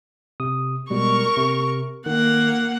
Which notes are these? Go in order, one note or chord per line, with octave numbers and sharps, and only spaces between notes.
C3 D#6
B2 G3 G#3 A#4 C#6
C3
D#3 A#3 F#5